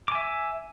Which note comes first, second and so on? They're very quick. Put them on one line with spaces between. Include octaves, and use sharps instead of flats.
D6 G#5 E5